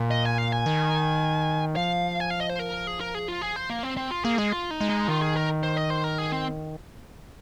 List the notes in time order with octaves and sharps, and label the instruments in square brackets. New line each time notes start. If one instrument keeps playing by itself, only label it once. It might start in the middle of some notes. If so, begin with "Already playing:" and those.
Already playing: [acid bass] A#2
[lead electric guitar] D#5
G#5
F5
G#5
[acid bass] D#3
[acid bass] F3 [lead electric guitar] F5
[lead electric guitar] G#5
F5
D#5
C5
A#4
G#4
A#4
G#4
F4
G#4
C5
A#3
C4
[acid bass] D#3 [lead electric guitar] C4
[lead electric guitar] F4
[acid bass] A#3 [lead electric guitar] G#4
[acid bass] G#3 [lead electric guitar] G#4
[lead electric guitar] F4
D#4
[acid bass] G#3
[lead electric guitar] D#4
[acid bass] D#3 [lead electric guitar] F4
[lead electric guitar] G#4
A#4
C5
D#5
C5
A#4
G#4
C4